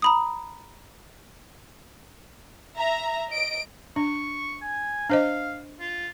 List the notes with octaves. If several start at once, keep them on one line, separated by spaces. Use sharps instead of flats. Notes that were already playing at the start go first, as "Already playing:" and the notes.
A#5 B5 D#6
E5 A#5
D#5 D7
D4 C#6
G#5
D4 C5 D#5 F5
F4